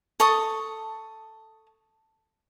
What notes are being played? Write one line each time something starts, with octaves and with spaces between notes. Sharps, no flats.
A4 A5 C#6 D#6